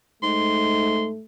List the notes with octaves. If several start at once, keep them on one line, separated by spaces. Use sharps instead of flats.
G#2 A3 C6